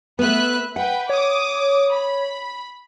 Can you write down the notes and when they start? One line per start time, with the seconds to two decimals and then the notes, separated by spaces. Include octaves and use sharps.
0.19 A3 B3 B4 E5 F#6
0.76 B4 F#5 G5
1.09 C#5 D6 D#6
1.91 B5